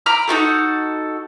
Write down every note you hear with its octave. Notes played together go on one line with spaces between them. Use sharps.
A#5 B5 D6 F6
D#4 F4 F#4 A4